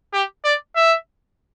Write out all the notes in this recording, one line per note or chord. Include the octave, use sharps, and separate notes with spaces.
G4
D5
E5